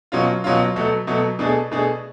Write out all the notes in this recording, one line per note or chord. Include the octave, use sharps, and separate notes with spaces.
B2 F#3 C#4 F4
B2 F#3 C#4 F4
B2 F#3 A3
B2 F#3 A3
B2 A3 D4 G#4
B2 A3 D4 G#4